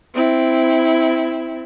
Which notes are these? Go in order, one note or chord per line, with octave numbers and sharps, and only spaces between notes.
C4 E4